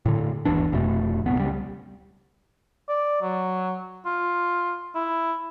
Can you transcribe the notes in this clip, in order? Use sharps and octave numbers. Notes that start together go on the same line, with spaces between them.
A2 D3
G1 D#2 E3 D4
F1 F2 B2 A3
D1 C2 B3
C#2 G3
D5
F#3
F4
E4